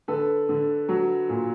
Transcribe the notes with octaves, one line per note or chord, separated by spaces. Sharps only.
D3 A4 B4
D3
F#3
A#2